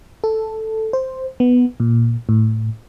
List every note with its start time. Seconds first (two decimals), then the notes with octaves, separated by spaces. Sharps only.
0.24 A4
0.93 C5
1.40 B3
1.80 A#2
2.29 A2